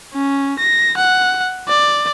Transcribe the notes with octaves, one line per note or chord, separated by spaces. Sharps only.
C#4
A#6
F#5
D5